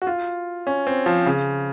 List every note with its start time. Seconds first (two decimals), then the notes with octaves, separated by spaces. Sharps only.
0.02 F#4
0.07 F4
0.67 C#4
0.87 C4
1.06 F3
1.26 C#3